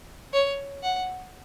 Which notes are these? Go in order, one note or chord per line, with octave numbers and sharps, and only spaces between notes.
C#5
F#5